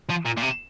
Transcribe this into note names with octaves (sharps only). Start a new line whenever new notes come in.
F3
A#2
A#2
C3